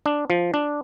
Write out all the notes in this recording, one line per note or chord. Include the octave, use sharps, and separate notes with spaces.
D4
F3
D4